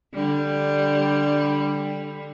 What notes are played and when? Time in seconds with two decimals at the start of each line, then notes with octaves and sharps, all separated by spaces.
0.14 D3 G3